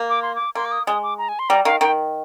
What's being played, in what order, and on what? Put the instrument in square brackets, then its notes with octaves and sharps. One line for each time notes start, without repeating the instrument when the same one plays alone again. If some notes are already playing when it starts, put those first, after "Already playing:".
Already playing: [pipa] A#3
[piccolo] D6
C6
D6
[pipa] A#3 [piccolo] C6
[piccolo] D6
D#6
[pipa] G#3 [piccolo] D#6
[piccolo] D6
A#5
G#5
C6
[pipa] G3 [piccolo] A#5
[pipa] D#3 [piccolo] F5
[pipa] D#3 [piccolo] G5